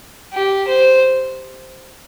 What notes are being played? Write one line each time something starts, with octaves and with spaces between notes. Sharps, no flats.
G4
C5